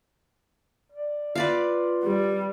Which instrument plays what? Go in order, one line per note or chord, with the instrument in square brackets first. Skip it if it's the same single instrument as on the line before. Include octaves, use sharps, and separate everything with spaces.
[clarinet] D5
[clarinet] F4 [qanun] B4 D5 F5
[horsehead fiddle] G3